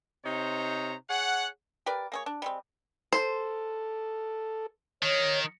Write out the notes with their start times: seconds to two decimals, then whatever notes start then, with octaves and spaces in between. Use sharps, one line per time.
0.25 C3 D#4 C5 C#5 A#5
1.09 G#4 C#5 F#5
1.86 G4 A#4 B4 D5
2.12 A#3 G#4 C#5
2.26 D4
2.42 G3 G#3 C4
3.13 A4 C5
5.03 D#3 C#5